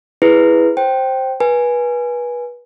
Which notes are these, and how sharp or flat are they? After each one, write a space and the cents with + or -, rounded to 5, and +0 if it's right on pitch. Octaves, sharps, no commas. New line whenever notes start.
E4 +0 G#4 +0 B4 +0
C5 +10 G5 -10
B4 -25 G#5 +0